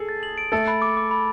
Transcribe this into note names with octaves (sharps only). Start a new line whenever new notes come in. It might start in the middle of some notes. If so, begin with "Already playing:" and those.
Already playing: G#4 A4
A6
F#7
D7
A3 A4 A6
B5
D6
D6
B5